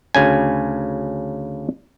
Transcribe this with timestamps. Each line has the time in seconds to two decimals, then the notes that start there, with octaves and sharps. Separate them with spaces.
0.15 D2 C#3 G#5